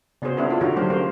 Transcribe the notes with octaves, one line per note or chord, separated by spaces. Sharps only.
C#3 B3 C#4 F#4 G#4 C5
B3 D4 E4 G#4 A#4
A#3 F4 A4
D3 D#3 F#4 G4 A#4 C#5
D3 F#3 A3 A#3 G4 C5
A#3 C#4 A#4 C5